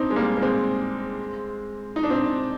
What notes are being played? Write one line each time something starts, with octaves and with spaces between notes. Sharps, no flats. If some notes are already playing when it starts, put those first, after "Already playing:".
Already playing: C4 D4 D#4
G#3
G3 A#3
A#3
G#3 C4
D#4
D4
C4 D#4